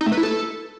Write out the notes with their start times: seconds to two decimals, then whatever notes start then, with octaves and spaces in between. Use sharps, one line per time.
0.01 D#4
0.06 A3
0.12 B4
0.17 E4
0.23 A4